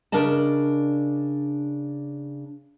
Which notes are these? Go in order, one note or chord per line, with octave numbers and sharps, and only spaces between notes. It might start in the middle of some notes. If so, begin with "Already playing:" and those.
C#3 D4 A#4 D5 D#5 A5